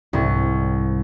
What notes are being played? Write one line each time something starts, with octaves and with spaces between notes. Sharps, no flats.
C2 G#2